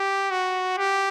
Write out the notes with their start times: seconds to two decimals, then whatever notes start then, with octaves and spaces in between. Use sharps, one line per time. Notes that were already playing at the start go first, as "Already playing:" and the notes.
Already playing: G4
0.31 F#4
0.78 G4